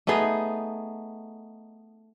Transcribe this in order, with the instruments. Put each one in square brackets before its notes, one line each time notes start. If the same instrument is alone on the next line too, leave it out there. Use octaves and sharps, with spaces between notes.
[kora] A3 B3 D#4 G#4